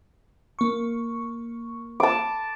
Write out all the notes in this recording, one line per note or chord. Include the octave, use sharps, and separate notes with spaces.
A#3 C#6
A5 D6